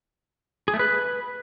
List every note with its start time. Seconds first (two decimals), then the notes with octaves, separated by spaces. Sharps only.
0.68 G#4
0.74 A3
0.79 B4